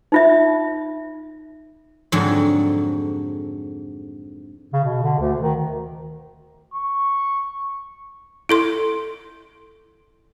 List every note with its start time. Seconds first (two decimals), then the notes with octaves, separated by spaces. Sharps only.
0.12 D#4 F4 E5
2.12 F2 G#2 D3 F#3
4.73 C#3
4.85 B2
5.03 D3
5.19 D2
5.42 D#3
6.74 C#6
8.49 E4 A4 C6